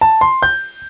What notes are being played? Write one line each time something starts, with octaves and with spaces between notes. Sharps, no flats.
A5
C6
G6